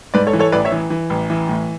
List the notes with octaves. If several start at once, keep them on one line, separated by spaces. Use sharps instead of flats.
G#2 B4 D5
A4 C#5
E3
A4 C#5
A1 B4 D5
C#5 E5
E3
E3
A1
E3
A2